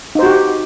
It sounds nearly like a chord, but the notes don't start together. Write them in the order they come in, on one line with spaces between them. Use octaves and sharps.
D#4 C5 F#4 G4